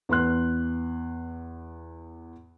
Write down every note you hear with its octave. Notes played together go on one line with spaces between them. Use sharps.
E2 B4 C6 F#6